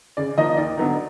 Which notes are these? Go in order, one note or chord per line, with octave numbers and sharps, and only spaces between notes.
C#3 D5
F3 A#3 D#4 D#5
D#2 D5
D3 F#3 B3 D#4